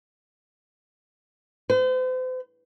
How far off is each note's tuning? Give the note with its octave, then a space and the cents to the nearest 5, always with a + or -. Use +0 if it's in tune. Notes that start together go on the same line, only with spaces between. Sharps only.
C5 -40